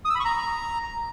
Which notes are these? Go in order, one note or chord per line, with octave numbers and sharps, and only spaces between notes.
D#6
E6
B5
C#6
A#5